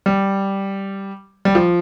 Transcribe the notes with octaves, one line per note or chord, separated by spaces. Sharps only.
G3
G3
F3